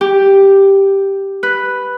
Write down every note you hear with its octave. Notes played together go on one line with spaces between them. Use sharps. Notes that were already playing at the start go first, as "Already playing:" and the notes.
G4
B4